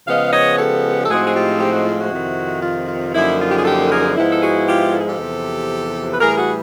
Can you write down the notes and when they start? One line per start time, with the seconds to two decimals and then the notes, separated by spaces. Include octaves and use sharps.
0.07 C#3 F3 G#3 B3 D#5 F5
0.32 C#5 D#5
0.58 G4 A4
1.05 A4
1.09 A2 F3 G#3 C4 D#4 F#4 G#4
1.27 G#4
1.35 F4 G4
1.61 G4
1.73 F#4
1.85 F4
1.98 E4 F#4
2.12 F2 C3 D#3
2.63 F4
2.89 F4
3.14 F#2 D3 F3 A#3 D#4 E4
3.40 F4
3.51 G4
3.58 G#4
3.65 G4 A4
3.90 G#4 A#4
4.16 G#2 F3 G#3 B3 E4
4.32 A4
4.42 F#4 G#4
4.67 F4 G4
4.93 A4
5.01 G#4
5.08 G4 A4
5.18 E2 C3 F3
6.14 B4
6.21 A2 E3 G3 G#4 A#4
6.37 F#4 G#4